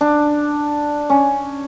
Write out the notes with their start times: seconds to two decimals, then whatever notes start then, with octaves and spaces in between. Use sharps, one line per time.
0.01 D4
1.10 C#4